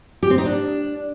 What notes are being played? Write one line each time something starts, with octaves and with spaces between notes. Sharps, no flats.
G4
C4
D#4
D4